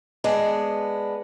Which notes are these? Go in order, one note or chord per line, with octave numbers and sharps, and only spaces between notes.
G#3 B3 D4